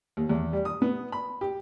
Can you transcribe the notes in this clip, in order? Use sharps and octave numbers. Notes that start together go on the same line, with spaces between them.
D#2
E2
G3
D#6
B3
B5
G4